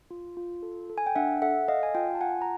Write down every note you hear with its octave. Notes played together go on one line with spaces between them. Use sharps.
F4
F4
A4
A4
G#5
G5
D4 E5 F#5
A4 E5 F#5
A4 D#5 F5
G#5
F4 F5 G5
A5
F4 F#5 G#5
A#5